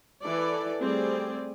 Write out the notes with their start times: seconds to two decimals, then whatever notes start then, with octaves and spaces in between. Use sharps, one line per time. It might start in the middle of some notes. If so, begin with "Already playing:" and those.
0.23 E3 A4 D5
0.81 G3 A3 C4 G#4 D5